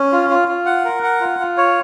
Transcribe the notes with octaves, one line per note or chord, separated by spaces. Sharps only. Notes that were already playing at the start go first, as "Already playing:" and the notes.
Already playing: C#4
F4
F4
F4
F#5
A#4
F#5
F4
F4
C#5